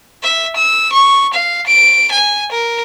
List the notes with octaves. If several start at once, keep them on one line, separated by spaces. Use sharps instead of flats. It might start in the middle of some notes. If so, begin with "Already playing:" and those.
E5
E6
C#6
F5
D7
G#5
A#4